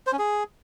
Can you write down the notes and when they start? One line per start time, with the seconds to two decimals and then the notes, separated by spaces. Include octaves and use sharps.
0.07 C5
0.13 C#4
0.19 G#4